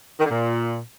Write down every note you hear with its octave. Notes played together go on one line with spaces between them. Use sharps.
D#3
D3
A#2